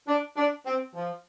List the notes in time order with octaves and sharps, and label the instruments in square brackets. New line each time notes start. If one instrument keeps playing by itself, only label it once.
[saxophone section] D4
D4
C4
F3